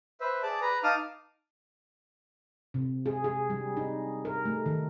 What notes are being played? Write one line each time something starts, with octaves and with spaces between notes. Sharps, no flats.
B4 C5 E5
G#4 D5 A5 D6
B4 A#5
D#4 F5 A5 D6 D#6 F6
C3
G#4
G#4
G3
D#4
A#4
A3
D#3